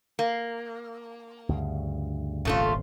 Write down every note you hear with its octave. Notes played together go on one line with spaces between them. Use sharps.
A#3
D2 G2 C#3
D#1 G#1 C#3 A3 F4